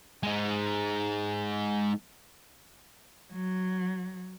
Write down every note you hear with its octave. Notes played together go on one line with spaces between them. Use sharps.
G#3 D#4
F#3